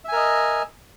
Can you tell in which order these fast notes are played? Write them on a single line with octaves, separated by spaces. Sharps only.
E5 G#5 A#4 D#5